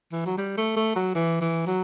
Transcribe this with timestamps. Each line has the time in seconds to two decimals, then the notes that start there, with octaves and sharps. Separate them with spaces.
0.12 E3
0.26 F#3
0.38 G3
0.58 A3
0.76 A3
0.96 F#3
1.15 E3
1.41 E3
1.67 F#3